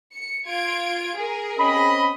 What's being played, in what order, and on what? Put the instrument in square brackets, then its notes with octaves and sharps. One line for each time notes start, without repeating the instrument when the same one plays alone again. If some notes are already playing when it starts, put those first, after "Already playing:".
[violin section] C#7
F4 G#6 D7
G#4 A#4
[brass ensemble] C4 C#4 D#5 [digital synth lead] B5